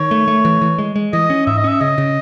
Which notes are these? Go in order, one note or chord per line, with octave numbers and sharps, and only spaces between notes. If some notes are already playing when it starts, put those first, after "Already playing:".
Already playing: D#3 C#5
A3
A3
E3
E3
G#3
G#3
E3 D#5
C#4
G#2 E5
D#5
C#4 E5
C#3 D#5
C#3